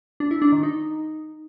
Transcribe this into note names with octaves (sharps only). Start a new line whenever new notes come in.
D4
E4
D4
D#3
D#4